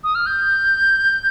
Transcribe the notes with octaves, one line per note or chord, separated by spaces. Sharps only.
D#6
F6
G6